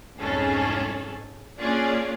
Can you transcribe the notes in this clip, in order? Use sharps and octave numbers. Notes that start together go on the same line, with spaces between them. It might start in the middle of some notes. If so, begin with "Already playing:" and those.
C2 F2 G#2 C#4 G#4 A4
A#3 C#4 D4 F4 G#4 D5